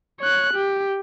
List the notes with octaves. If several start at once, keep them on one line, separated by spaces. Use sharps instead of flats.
C#5 F#6
G4